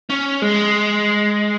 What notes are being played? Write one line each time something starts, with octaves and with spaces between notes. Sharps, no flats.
C#4
G#3